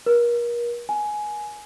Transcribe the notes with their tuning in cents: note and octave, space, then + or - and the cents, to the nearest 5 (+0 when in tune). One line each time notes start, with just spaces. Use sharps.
A#4 +35
G#5 +15